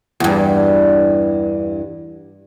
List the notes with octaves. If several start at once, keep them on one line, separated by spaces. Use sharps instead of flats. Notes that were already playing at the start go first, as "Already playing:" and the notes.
E2 G2